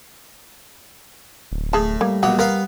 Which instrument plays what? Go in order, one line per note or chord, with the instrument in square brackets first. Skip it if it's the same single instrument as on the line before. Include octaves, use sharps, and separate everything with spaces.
[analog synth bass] D1
[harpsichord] A2 [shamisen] G#4 A5
[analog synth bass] G3 [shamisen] A#3
[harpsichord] A#1 F#3 [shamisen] B3 F#5
[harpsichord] B3 F5 [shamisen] A#4